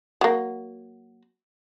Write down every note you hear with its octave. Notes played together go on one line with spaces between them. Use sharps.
F#3 A#3